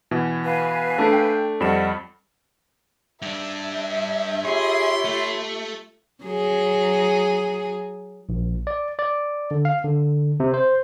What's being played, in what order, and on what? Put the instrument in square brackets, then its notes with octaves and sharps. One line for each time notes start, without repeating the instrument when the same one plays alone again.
[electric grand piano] B2 E3
[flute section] B4 F5 G#5
[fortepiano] A3 D4
[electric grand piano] G5
[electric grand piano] F2 G3 E7 [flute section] D5 D#5 F#5
[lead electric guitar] G2 D4 [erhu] E5
[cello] F4 G4 [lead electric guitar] G#4 [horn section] C#5 B5 C6
[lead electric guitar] A3
[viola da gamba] F#3 G#4
[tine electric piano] A#1
D5
D5
D3
F5
D3
C3
C5